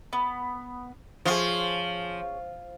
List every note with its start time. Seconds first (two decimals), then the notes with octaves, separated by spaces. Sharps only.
0.13 B3
1.25 F3 C#4 F4 G#4